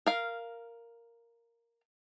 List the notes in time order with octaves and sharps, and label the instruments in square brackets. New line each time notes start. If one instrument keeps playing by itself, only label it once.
[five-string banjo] A#4 F5